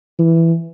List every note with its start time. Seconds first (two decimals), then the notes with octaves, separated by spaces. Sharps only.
0.19 E3